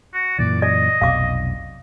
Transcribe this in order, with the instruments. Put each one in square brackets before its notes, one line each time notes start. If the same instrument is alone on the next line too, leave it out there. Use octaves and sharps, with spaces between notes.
[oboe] F#4
[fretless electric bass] F#2 A#2 E3 [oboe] D5
[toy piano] D5 [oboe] D#5
[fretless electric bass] F1 B1 B2 [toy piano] F5 D6